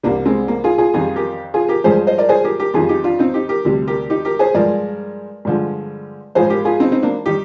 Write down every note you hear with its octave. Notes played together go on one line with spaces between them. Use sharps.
C2 C3 G3 A#3 D4
G#3 C4
A#3
F4 G#4
F4 G#4
F2 D#3 G3 F4 G#4
G4 A#4
F4 G#4
G4 A#4
G2 F3 G#3 G#4 C5
C5 D#5
A#4 D5
G#4 C5
G4 A#4
G4 A#4
F2 D#3 G3 F4 G#4
D#4 G4
D4 F4
C4 D#4
D#4 G4
G4 A#4
D2 C3 G3
G4 A#4
D#4 G4
G4 A#4
G#4 C5
G2 F3 G#3 A#4 D5
G2 D3 F3 G#3
A#1 G#2 F3 G#3 G#4 C5
G4 A#4
F4 G#4
C4 D#4
C4 D#4
A#3 D4
D#3 G3 D#4 G4